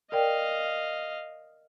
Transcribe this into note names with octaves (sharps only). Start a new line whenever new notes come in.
A#4 D5 D#5 F5 G5